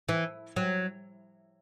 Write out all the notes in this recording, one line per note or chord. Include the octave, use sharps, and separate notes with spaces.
E3
F#3